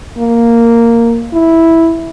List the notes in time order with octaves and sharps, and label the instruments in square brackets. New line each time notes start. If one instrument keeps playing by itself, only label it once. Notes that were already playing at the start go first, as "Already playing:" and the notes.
[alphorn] A#3
E4